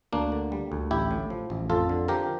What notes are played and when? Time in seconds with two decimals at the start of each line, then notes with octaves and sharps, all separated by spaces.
0.13 D2 A#3 D4
0.32 D3
0.52 G3
0.72 D2
0.91 A1 E4 G4
1.11 A2
1.30 F3
1.50 A1
1.70 F2 F4 A4
1.89 D3
2.08 F3 G4 A#4